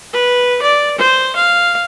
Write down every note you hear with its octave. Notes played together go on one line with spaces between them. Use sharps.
B4
D5
C5
F5